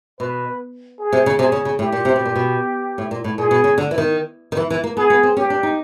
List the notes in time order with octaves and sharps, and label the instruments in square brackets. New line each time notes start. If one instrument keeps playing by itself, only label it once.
[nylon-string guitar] B2 [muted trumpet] B4
[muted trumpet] G#4
[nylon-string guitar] C3
C#3
[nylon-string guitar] C3 [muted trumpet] G#4
[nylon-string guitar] C#3
C#3
[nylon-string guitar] A2 [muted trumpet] G4
[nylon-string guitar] A#2
C3
B2
A#2
B2
A2
A#2
A2
[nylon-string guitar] A#2 [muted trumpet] G#4
[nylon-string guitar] B2
C#3
D3
E3
D#3
D#3
E3
E3
A#3
[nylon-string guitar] B3 [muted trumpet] G#4
[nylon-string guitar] B3
C4
[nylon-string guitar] C#4 [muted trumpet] G4
[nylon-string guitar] D4
D#4